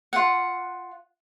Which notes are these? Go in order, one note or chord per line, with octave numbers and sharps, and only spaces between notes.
F4 F#5